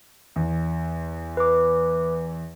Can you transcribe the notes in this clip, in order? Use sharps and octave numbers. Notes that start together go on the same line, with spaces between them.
E2
B4 D6